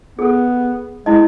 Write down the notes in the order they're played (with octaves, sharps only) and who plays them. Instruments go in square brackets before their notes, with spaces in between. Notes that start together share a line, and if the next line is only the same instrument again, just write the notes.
[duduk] B3 [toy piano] G#4 A4
[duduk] G#3 [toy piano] E4 D#5